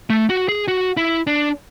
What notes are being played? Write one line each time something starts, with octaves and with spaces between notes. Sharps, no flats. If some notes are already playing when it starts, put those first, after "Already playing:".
A3
F#4
G#4
F#4
E4
D4